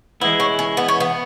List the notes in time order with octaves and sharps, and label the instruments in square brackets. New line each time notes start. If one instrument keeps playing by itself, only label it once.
[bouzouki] B3 [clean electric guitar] E4
[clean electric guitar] E3 G#3
[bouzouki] C#4
C#4
B3
C#4
B3